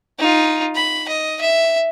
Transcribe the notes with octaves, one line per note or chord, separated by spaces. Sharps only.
D#4 F4
B5
D#5
E5